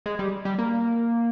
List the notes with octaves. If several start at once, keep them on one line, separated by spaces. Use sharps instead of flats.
G#3
G3
G3
A#3